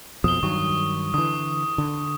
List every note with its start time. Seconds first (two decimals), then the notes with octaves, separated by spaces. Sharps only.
0.24 F2 B2 F3 D#6 G7
0.43 G2 D#3 F#3 C#6
1.14 D3 E3 D#6
1.78 D3